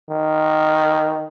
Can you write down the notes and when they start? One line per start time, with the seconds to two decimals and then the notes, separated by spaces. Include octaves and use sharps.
0.10 D#3